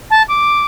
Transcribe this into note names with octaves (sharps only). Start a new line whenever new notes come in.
A5
D6